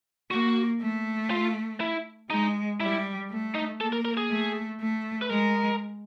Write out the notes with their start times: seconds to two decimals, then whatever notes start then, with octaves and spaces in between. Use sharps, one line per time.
0.31 A#3 F#4
0.80 A3
1.31 F4
1.80 E4
2.30 G#3 D#4
2.80 G3 E4
3.30 A3
3.55 D#4
3.81 A#3 A4
3.93 A#4
4.05 A#4
4.17 G#4
4.30 A3
4.80 A3
5.22 B4
5.29 G#3 A#4